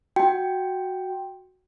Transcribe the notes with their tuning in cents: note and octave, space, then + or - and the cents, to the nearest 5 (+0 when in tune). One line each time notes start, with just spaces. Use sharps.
F#4 +0 G5 +0